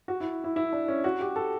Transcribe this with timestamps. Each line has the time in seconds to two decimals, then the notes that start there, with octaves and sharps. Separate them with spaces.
0.08 F#4
0.20 E4
0.44 E4
0.56 E4
0.73 D4
0.88 C#4
1.04 F#4
1.21 G4
1.36 A4